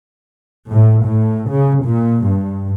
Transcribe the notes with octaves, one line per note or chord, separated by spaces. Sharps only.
A2
A2
C#3
A#2
G2